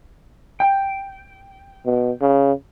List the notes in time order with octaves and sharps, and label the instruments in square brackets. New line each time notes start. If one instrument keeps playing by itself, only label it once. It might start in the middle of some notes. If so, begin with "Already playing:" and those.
[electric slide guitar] G5
[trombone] B2
C#3